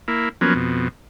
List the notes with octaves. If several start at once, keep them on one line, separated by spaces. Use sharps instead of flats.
A#3 E4
F3 F#3 A#3 B3 C#4
F2 B2